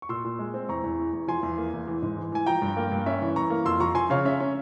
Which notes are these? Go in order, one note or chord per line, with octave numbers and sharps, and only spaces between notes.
C#6
A#2 C6 E6
A#2
G#3
C4
E2 A#5 C#6
E2
E3
E2
F3 G#5 C6
E2
A#3
E2
E3
G#2
E3
E3 G#5
F3 G5 A#5
G2
A#3
G2
C#4 E5
E3
E3 A#5 C#6
A#3
F2 C6 E6
F3 A#5 C#6
F3 G#5 C6
C#3 C#5 F5
C#4 E5
C#4